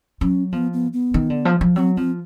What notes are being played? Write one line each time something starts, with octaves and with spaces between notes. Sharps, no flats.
F#3 C#4
F3 B3
B3
B3
D#3
D3
F3
F3
F#3 C4
F3 C4